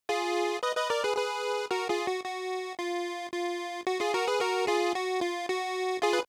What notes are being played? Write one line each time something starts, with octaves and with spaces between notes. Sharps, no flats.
F4 G#4
B4 D#5
B4 D#5
A#4 D5
G#4 B4
G#4 B4
F#4 A#4
F4 G#4
F#4
F#4
F4
F4
F#4
F4 G#4
F#4 A#4
G#4 B4
F#4 A#4
F4 G#4
F#4
F4
F#4
F4 G#4
B4